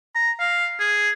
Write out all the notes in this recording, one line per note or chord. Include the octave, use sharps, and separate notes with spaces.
A#5
F5
G#4